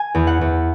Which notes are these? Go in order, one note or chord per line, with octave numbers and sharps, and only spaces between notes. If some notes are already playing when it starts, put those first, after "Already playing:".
Already playing: G#5
E2
F#5
E2